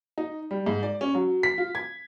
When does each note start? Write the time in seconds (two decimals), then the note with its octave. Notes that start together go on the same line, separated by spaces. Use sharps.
0.18 D#4
0.51 G3
0.66 G#2
0.83 D5
1.01 C#4
1.15 F#3
1.43 B6
1.58 F4
1.75 G#6